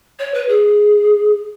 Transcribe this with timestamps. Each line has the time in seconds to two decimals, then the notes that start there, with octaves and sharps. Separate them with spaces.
0.19 C#5
0.34 B4
0.49 G#4